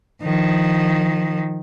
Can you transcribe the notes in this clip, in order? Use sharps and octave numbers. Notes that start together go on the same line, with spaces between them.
D#3 F3